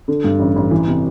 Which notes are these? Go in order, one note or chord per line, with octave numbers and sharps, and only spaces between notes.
D3
G2
A1
A1
E3
C3